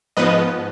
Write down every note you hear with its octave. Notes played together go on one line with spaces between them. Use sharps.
G#2 F3 B3 B4 D#5